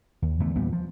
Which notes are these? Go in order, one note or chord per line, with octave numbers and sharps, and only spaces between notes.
D#2
E2 D3 A3
E2 A#2 G3 B3
F3